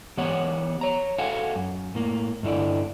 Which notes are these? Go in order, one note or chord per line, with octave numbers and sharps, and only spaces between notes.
E3 B3 G4 C#5 F#5
C#5 A#5
F#4 A4 F5 F#5 G#5
F#2
A2 A#3
G2 D3 E4 D5